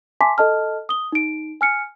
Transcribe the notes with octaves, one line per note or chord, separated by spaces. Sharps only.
E5 G#5 A5 C6 D6 B6
A4 D#5 A5 F6
D#6 G7
D#4 D7
G#5 F6 C#7